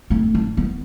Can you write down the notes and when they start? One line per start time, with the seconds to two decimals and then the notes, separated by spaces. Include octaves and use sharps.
0.10 A3 C4
0.35 D4
0.57 B3